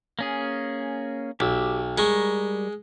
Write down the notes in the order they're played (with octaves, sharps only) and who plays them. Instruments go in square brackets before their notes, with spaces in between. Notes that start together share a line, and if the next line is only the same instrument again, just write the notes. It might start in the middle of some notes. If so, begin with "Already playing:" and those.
[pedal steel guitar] A#3 C#4 G#4
[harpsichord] B1 [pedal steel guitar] G4 D6 E6
[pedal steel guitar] G3 A#4 C#6 [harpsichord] G#3